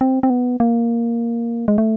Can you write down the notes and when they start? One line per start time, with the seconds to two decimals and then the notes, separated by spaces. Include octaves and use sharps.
0.01 C4
0.23 C4
0.30 B3
0.60 A#3
1.68 G#3
1.78 A3